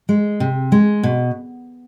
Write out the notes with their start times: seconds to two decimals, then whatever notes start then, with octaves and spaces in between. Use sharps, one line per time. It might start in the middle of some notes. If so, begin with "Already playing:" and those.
0.09 G#3
0.40 C3
0.72 G#3
1.03 B2